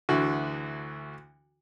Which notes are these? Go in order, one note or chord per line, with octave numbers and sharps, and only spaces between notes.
D2 D3 E3 F#4